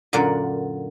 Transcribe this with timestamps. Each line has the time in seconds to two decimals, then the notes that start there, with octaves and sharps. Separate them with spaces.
0.13 F#2 A#2 D3 D5 F#5